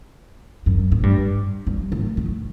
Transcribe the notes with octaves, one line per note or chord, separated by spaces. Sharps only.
F#2
A2
G2
G2
A2
A2